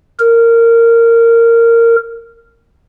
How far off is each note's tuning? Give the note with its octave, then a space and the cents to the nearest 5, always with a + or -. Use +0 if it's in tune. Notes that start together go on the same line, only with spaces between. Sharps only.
A#4 -15